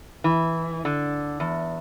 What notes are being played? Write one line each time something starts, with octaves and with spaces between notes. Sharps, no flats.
E3
D3
E2